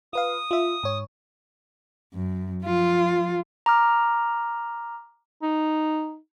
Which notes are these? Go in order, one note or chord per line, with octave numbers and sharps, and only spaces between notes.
F4 B4 F5 D#6
F4 E5
G#2 C#5
F#2
F3 F4
A#5 D6 F6
D#4